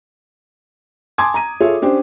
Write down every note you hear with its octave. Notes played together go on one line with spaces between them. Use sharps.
G#5 A5 C6 D6 D#6 G#6
A#5 D#7
F4 G#4 A4 C#5 E5
C#4 D4 G4 C5